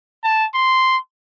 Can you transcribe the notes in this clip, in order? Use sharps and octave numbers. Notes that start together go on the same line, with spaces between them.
A5
C6